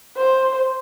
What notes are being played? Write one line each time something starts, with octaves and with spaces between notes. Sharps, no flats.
C5